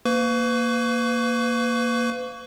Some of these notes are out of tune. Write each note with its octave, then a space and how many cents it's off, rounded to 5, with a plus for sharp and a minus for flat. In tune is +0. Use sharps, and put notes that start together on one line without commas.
A#3 +0 B4 +35 C#6 +25